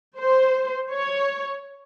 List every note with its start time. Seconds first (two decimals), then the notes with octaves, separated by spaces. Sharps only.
0.18 C5
0.92 C#5